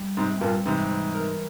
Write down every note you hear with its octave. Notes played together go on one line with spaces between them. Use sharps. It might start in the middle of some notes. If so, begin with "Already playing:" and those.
Already playing: G3
G#2 C3 C4
G2 A#2 C4
G#2 C3 E3
E3
A#4